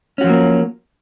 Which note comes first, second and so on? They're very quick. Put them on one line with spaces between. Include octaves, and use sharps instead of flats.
C#4 F#4 F3 F#3 A#3